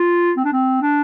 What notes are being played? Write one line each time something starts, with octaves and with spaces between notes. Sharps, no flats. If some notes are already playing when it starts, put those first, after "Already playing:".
Already playing: F4
C4
D4
C4
D4